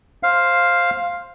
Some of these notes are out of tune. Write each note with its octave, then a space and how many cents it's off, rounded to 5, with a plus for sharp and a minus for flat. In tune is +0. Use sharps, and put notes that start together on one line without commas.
C5 +10 F5 +0